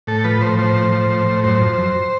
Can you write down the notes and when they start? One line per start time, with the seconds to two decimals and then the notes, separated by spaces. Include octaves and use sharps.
0.07 A2 A4
0.24 F3 B4
0.41 A2 C5
0.59 F3 C5
0.76 A2
0.92 F3
1.10 A2
1.27 A2
1.44 F#2 C5
1.61 F3
1.78 F#2